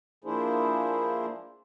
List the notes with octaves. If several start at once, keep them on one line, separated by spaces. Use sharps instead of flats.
F3 A#3 D4 E4 G#4 C5